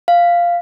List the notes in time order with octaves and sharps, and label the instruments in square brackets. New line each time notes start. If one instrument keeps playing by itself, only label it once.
[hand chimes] F5